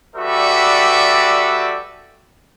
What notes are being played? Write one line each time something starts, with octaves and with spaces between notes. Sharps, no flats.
G3 F#4 A4 B4 D5 E5